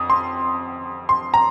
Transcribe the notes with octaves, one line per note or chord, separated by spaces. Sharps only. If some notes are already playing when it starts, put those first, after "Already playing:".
Already playing: F2 D#6
C6
C6
A#5